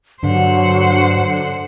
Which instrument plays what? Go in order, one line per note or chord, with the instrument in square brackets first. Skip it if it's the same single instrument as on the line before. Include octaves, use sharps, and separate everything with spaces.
[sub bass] G2 [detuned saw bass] D3 [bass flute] F#3 [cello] C5 F#5